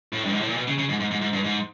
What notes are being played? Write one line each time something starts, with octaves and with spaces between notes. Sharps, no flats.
A2
G2
G#2
A2
A#2
B2
C#3
C#3
G#2
G#2
G#2
G#2
G2
G#2